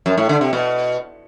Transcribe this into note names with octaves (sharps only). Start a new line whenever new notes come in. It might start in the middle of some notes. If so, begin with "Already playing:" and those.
F#2
A2
D3
C3
B2